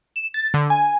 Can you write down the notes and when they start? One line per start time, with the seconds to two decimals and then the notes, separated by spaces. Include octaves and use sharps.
0.16 E7
0.34 A6
0.54 D3
0.70 G#5